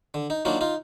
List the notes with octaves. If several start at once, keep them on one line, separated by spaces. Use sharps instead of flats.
D3
D#4
F#3 A#3 D4 D#4 F4
D#4 F4